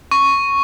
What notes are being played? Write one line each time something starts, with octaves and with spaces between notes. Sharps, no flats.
C#6